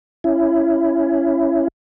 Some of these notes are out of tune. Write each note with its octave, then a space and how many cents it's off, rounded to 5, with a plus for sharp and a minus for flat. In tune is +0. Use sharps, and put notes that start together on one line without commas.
C#4 +0 E4 +15